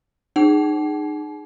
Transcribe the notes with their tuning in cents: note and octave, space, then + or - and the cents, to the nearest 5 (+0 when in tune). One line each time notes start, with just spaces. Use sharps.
D#4 -35 G#4 +0 F#5 +45